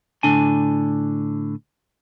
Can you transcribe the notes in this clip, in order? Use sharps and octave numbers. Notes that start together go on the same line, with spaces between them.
A2 D3 D4 G#5